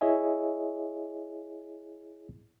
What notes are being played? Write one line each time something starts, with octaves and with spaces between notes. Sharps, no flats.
E4 G#4 C#5 D#5 E5 G#5